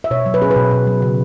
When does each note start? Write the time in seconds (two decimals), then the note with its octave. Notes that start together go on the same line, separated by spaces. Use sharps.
0.04 E5
0.11 B2 C#5
0.26 F#3
0.34 B4
0.41 C#4 G#4
0.51 B4
0.56 B2
0.71 B2
0.87 F#3
1.02 C#3